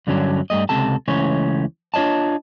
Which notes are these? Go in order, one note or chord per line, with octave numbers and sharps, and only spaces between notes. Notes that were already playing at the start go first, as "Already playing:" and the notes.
G2 D3 F#3 C#4 D4
G2 G3 A3 D#5
C#2 C3 A4 A5
C#2 E3 A3 C#4 C5 C#5
D4 F4 C#5 D#5 A5